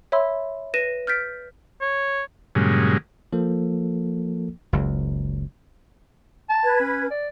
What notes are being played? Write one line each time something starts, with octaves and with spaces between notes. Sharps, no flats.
C#5 E5 B5 C6 E6
B4 A#6 D#7 E7
F6 G6 A6 B6 D7
C#5
G2 A#2 C#3 F#3 G#3
F3 A#3 A4
F#1 C#2
A5
B4 G#6
C#4
D5